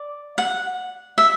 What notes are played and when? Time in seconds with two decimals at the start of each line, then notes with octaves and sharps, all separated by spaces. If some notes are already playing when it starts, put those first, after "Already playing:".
Already playing: D5
0.38 F#5
1.18 E5